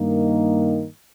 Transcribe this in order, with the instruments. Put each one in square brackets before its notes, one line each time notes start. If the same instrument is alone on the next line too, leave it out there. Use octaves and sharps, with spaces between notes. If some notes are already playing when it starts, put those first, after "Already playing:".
Already playing: [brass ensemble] G2 D#3 A#3 D#4